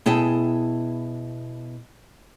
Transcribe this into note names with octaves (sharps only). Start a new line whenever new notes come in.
B2 E4 G#4 G5 A5